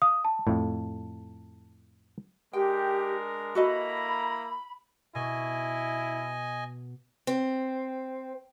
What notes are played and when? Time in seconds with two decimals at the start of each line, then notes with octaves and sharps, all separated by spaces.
0.02 F5 D#6
0.24 A5
0.47 F2 A2
2.53 G#3 D4 G4 A#4 G5
3.55 A#3 E4 F#4 A4 D#5 A#5 B5
5.15 B2 E4 D#5 G#5
7.27 C4